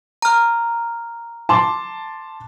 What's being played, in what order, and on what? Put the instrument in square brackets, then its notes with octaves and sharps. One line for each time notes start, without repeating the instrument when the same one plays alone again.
[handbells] A#5 F6
[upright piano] A5 C6 D6